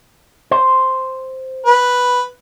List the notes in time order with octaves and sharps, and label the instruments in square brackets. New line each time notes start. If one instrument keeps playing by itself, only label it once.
[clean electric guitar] C5
[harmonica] B4